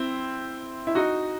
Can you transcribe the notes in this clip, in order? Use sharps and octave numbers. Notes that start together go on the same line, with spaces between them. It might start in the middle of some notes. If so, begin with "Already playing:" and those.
Already playing: C4 E4
E4
D#4 F#4